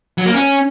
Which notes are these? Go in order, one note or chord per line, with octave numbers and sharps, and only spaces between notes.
F#3
A#3
C#4